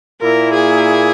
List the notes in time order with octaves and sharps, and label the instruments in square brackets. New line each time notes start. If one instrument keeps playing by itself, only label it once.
[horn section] A#2 A#3 E4 [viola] A#4
[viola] G#4